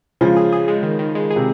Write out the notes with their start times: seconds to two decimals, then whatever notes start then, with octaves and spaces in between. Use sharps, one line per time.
0.21 C#3 F3 G#3
0.37 G#4
0.52 G#4
0.68 G#3
0.83 D#3
0.99 D#3
1.15 G#3
1.31 G#4
1.36 C3